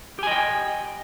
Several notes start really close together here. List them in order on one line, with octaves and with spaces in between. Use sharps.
G4 G#5 D#5 G5